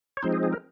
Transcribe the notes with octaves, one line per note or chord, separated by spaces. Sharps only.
C#5
F3 G#3 C4 D#4 C5
G#4
G#4
A#4